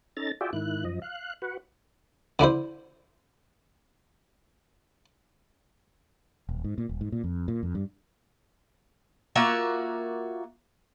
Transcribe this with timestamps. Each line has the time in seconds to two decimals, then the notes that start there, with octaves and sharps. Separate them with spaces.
0.17 C#4 D#4 A4 A#5 A6
0.41 F4 F#4 G#4 D5 E5 G5
0.53 G#2 D#3 E4 F#6
0.85 F#2 F3 D#5
1.02 F5 F#6
1.42 F#4 B4 F#5
2.39 D3 D4 E4 C5
6.49 D#1
6.64 G#2
6.78 A#2
6.89 D#1
7.01 G#2
7.12 A#2
7.24 F2
7.48 A#2
7.63 F2
7.75 G2
9.36 A#3 F4 F#4 E5